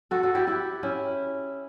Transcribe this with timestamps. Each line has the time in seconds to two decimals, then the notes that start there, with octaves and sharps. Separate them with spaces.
0.11 F#4 A4
0.23 F#4 A4
0.35 E4 G4
0.47 E4 G4
0.83 C#4 E4